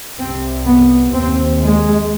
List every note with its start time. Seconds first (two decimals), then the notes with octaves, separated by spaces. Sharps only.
0.19 C2 C3 C4
0.66 B3
1.13 D#2 C4
1.60 G#3